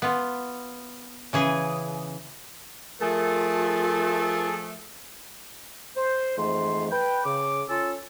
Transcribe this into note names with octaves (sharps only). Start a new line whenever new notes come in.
B3 F4
C#3 E3 G#4
F3 A3 F4 G#4 A#4 A5
C5
F2 G#2 E3 A3 C6
B4 G5
C#3 D6
C#4 F4 A4